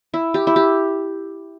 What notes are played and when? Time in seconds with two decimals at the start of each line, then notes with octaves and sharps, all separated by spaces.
0.14 E4
0.34 G4
0.47 E4
0.56 G4